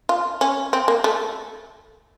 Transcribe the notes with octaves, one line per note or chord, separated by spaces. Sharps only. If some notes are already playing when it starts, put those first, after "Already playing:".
F4
C#4
C4
A#3
A3